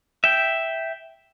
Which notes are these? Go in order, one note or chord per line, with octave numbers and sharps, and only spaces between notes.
E5 G5